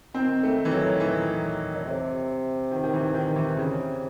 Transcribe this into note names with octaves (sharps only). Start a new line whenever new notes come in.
D#3 C4
A3
E3
F#3
E3
A2
C3
D#3
D#3
E3
D#3
E3
C#3